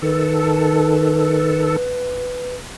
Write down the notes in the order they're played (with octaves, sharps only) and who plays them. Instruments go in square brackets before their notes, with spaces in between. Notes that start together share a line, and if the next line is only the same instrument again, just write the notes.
[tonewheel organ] D#3 A4 [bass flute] B4